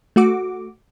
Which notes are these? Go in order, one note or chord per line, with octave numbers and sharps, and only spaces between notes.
A3 F#4 D6